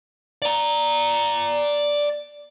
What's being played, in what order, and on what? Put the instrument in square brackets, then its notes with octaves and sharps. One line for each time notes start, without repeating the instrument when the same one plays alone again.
[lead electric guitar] D5 A#5